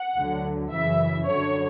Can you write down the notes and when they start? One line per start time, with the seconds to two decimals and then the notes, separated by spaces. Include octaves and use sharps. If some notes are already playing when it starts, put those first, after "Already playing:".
Already playing: F#5
0.16 D2 D3 F#3
0.71 F#2 C#3 E3 E5
1.26 F#2 D3 F#3 C#5